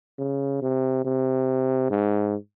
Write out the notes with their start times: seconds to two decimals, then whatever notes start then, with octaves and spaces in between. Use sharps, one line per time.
0.19 C#3
0.62 C3
1.05 C3
1.90 G#2